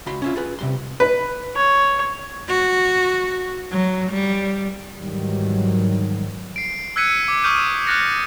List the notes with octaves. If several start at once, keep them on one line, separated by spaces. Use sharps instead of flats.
C#2 F#4 B5 C6
C#4 E4 F4
F4 G#4 B4
C3 G3 C6
B4
C#5
F#4
F#3
G3
G#2 D#3 E3 F#3 G3
C7 D7
E6 F#6 G#6 B6 C#7 D#7
D6
C#6 D#6 F6 G6 D#7
D6 F6 F#6 A6 A#6 C#7